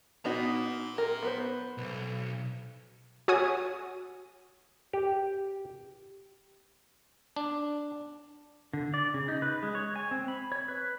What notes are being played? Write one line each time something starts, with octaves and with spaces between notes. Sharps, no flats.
B3 D#4 F#4 A#5 C6
A#4
B3 B4 C5
B1
F#4 C#5 G#5 D#6
G4
D4
D3
D5
C#3
D#4
B4
G#3
C#5
G#5
C4
B5
C#5
B4